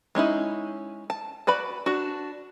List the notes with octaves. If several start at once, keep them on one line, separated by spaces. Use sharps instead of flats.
G#3 C#4 D#4 E4
A5
F#4 B4 D5 B5
D4 F#4